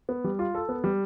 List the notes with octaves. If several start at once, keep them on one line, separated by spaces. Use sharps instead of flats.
B3
G3
F4
A4
B3
G3